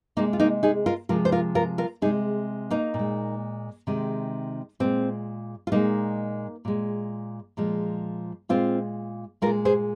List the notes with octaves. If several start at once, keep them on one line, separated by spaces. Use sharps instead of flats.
C3 G#3 A#3 D#4
F4
A#3 D#4
D#4 G#4
F4 A#4
C3 F3 G#3 F4 A#4
C5
F4 A#4
F4 A#4
F4 A#4
C3 G#3 D#4 G#4
A#3 D#4
A#2
G#3
C3 D#3 G#3
A#2 G#3 C4
F4
A#2 G#3 A#3 D#4
A#2 G#3
A#2 F3 G#3
A#2 G#3 C4 F4
A#2 G#3 F4 A#4
G#4 C5